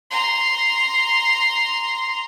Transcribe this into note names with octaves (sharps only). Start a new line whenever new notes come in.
A#5 C6